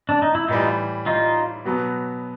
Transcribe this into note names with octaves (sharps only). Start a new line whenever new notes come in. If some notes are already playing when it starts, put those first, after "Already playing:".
D4
D#4
E4
A2 E3 G3 D#4 F4
D#4 F4
B2 F#3 B3